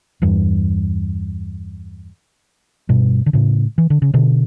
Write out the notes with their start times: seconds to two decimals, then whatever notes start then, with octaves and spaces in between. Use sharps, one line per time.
0.22 E2 G2
2.89 G2 B2
3.26 D3
3.33 A2 C#3
3.78 E3
3.90 D3
4.02 C#3
4.14 B2 D3